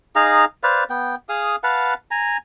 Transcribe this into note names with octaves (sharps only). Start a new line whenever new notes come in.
D#4 G#4 F5 A#5
B4 C5 D5 F5
B3 G5
G#4 F5 D#6
B4 F5 F#5 A5
G#5 A#5